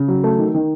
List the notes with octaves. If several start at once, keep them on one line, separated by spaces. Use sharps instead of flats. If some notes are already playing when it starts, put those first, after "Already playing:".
Already playing: C#3
F#3
A3
D#3
D#3